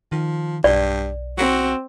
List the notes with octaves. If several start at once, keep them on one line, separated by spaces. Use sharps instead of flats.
D#3 F3
B1 G2 D5
C4 F#4